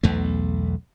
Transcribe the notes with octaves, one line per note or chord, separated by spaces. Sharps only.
B1 E2 A3